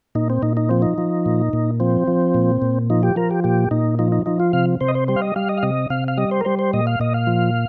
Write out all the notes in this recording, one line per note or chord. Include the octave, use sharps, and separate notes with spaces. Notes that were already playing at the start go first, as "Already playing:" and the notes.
A#2 D#4
C4
A#2 D#4
D#4
F3 C4
D#4
F3
A#2
A#2
F3 C4
F3
A#2
A#2
F3 D#4
G4
F3 A#4
G4
A#2 G4
A#2 D#4
F3 D#4
D#4
F3 D#4
F4
C3 F5
C3 C5
D#5
C5
G3 C5
F5
D#5
G3 F5
D#5
F5
C3 D#5
C3 F5
F5
G3 D#5
C5
A#4
G3 C5
C5
A#2 D#5
F5
A#2 D#5
F5
F3